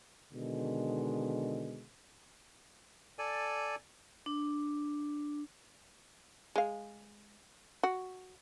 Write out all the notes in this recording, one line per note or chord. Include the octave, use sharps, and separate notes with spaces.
B2 D3 D#3 G#3
A4 D5 G#5
D4
G#3 F5
F#4